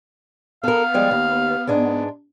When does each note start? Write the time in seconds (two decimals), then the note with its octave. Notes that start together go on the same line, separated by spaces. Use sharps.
0.64 B3 A4 A#4 F5
0.94 F3 G3 G#3
1.11 D#2
1.67 G#2 G#3 D4